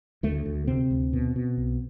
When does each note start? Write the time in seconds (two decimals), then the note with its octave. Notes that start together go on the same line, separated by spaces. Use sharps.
0.23 D2 A3
0.46 D2
0.67 C3 C4
0.91 D2
1.13 B2
1.36 B2
1.57 B1